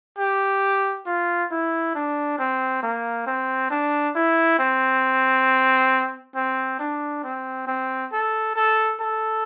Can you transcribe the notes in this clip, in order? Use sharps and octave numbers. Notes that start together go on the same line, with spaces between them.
G4
F4
E4
D4
C4
A#3
C4
D4
E4
C4
C4
D4
C4
C4
A4
A4
A4